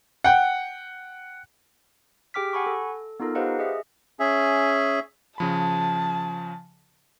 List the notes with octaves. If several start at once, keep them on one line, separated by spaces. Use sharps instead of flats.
F#5 G5
G4 G#4 G5 D6 F6 B6
F#5 G#5 B5 C#6
A4
B3 D#4 F4 A4 A#4
G4 B4 C5 D#5 F5 F#5
G#4 D#5 E5
C#4 G#4 E5
C#3 F3 A5 B5